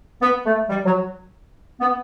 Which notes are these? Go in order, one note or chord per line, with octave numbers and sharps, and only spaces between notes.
B3
A3
G3
F#3
B3